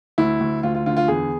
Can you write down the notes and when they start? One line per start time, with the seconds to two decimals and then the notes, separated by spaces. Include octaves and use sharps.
0.18 D2 E4
0.41 D2
0.63 D2 F4
0.75 F4
0.86 D3 F4
0.97 F4
1.08 E2 G#4